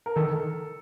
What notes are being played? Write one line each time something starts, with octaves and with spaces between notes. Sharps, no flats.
A#4
D#3 A4